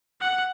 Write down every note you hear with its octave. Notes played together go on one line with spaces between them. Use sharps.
F#5